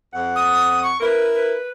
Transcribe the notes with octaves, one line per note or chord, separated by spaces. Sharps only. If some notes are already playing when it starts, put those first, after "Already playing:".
F2 F#5
D#6
C#6
E4 A#4 B4
B4